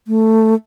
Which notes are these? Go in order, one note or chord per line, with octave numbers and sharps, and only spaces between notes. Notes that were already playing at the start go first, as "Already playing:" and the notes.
A3